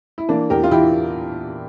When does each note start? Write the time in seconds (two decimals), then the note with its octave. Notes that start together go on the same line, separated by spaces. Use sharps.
0.18 E4
0.29 E3 A#3 D4
0.50 E2 G4 A#4
0.63 F4
0.71 E3 E4 G4